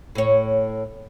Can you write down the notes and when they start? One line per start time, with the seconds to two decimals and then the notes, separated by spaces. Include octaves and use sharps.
0.15 A2 C#5